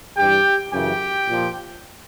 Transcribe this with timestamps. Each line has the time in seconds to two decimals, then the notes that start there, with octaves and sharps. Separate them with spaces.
0.17 G2 E3 G4 G5
0.72 F#2 C#3 E3 G4 G5
1.28 A#2 F3